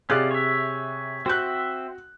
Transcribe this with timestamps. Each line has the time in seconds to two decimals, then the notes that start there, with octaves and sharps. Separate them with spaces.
0.10 C3 C#4 F4 G#4 D5 F#6
0.31 C#5 E5
1.26 C4 F#4 C5 E5 F#6